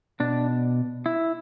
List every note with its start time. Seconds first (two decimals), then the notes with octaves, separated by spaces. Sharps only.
0.20 B2 D4
1.06 E4